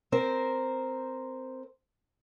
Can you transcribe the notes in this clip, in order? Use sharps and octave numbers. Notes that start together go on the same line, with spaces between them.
C4 A#4 C5